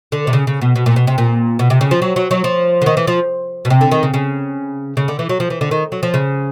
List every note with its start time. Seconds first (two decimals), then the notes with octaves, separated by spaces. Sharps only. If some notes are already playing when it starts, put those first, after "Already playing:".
0.12 D3
0.27 C3
0.33 C#3
0.47 C#3
0.61 B2
0.76 B2
0.86 A#2
0.96 B2
1.07 C3
1.18 A#2
1.59 B2
1.70 C3
1.81 C#3
1.91 F3
2.02 F#3
2.16 F#3
2.31 F#3
2.44 F3
2.82 D3
2.86 D#3
2.97 E3
3.07 F3
3.65 B2
3.70 C3
3.81 D3
3.91 D#3
4.03 C#3
4.14 C#3
4.97 C#3
5.08 D3
5.19 E3
5.29 F#3
5.40 F3
5.50 E3
5.61 D3
5.71 D#3
5.92 F#3
6.03 F3
6.14 C#3